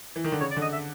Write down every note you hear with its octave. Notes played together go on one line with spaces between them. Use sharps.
E3
D#3
D3
C#3 C#5
D5
D3
D#5
E5